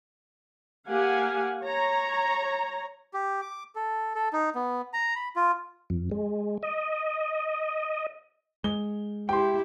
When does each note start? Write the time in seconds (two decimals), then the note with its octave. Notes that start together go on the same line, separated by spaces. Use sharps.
0.88 A#3 G4 F5 F#5 G#5
1.64 C#5 A#5
3.14 G4
3.42 D6
3.75 A4
4.15 A4
4.33 D#4
4.55 B3
4.93 A#5
5.16 B5
5.36 F4
5.90 F2
6.11 G#3
6.63 D#5
8.64 G#3 G7
9.29 E4 G4 G5 C6